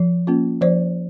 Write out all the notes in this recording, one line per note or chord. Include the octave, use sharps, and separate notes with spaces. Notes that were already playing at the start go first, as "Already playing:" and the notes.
Already playing: F3
A#3 C#4 F4
F3 C5 D5